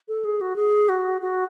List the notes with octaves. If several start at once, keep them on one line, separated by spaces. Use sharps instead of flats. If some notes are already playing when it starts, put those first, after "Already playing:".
A4
G#4
F#4
G#4
F#4
F#4